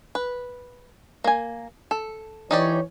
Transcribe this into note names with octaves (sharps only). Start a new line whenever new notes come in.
B4
A#3 G#5
A4
E3 D#4 G4 C#5 D5